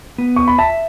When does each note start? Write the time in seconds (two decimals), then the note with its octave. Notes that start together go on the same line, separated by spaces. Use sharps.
0.18 B3
0.36 C#6
0.48 B5
0.58 E5 A5